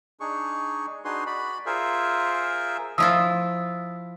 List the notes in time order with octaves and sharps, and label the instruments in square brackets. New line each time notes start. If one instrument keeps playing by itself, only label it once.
[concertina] D4 D#4 G#4 C#6
D4 D#4 F#4 G#4 B4 C6
F#4 D5 B5
F4 G#4 A#4 C5 E5
[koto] F3 E4 F4 [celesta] D#6 E6